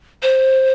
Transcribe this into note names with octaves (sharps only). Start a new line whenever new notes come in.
C5